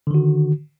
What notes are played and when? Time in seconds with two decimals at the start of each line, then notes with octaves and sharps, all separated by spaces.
0.07 D3
0.11 D#3
0.15 F#4